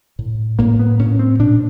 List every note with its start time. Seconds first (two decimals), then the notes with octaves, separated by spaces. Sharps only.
0.19 A2
0.59 A2 A#3
0.79 B3
0.99 A2 C#4
1.19 C4
1.39 A#2 D4